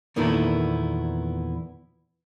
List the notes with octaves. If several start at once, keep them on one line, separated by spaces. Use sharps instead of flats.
E2 A#2 D#3 A3 B3 E4